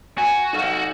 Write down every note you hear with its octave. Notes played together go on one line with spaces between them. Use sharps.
F#4 G#5
D#4 A4 F5